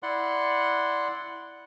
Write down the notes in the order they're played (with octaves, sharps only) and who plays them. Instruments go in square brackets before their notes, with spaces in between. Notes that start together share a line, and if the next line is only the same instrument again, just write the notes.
[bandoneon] E4 D5 F#5 C6 F#6